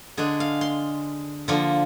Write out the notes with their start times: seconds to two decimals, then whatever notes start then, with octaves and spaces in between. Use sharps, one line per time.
0.17 D3 G#3 D4 G#4
0.40 F5
0.61 C6
1.48 D3 F3 A#3